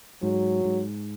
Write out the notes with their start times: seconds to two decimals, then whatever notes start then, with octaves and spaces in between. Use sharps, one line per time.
0.22 G#2 F#3
0.65 G#2